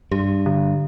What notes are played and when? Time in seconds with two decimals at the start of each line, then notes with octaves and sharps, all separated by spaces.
0.11 G2 G4
0.46 D3